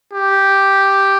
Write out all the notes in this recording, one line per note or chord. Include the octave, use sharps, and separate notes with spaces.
G4